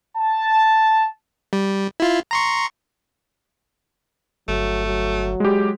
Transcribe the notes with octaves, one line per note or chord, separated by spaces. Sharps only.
A5
G3
E4 F4
A#5 C6 C#6
G1 F#3 A3
F#3
G#3 G4